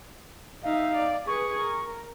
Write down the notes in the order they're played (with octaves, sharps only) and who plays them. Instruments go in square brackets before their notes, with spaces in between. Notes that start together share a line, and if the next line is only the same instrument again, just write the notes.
[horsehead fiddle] D#4 E5 [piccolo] F5
[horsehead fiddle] D5
[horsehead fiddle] G#4 B4 [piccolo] C#6
[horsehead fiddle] A#4